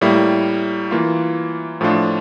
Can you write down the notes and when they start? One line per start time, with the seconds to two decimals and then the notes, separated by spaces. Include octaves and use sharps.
0.01 A2 G3 A#3 E4
0.91 E3 A#3 F4
1.81 A2 F3 A3 D4 F4